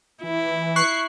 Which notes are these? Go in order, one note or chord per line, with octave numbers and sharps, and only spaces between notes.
E3 E4
C#6 F#6 C7